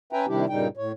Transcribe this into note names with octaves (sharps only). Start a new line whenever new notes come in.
C#4 B4 E5 G5 G#5 A#5
C3 D#3 G3 D4 E4 G4
G2 A#2 C#3 G3 D#4 G5
A2 C#5